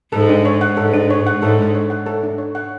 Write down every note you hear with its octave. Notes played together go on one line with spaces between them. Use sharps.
G#2 A4
D4
C#5
F#5
G#2 A4
D4
C#5
F#5
G#2 A4
D4
C#5
F#5
A4
D4
C#5
F#5